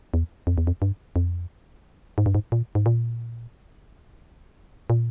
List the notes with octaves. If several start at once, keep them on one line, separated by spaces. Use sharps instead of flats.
E2
F2
E2
F2
G2
F2
G#2
G2
G#2
A#2
G#2
A#2
A#2